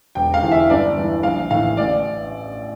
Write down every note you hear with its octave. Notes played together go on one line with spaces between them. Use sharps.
E1 G5
F5
E2 E3
E5
G1 D5
G2 E3
A#1 F5
A2 E3 F5
A1 D5